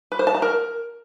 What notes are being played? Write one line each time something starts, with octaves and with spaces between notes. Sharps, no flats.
B4
C5
A5
A#5
A#4